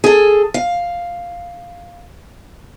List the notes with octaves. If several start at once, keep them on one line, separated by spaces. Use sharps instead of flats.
G#4 A4
F5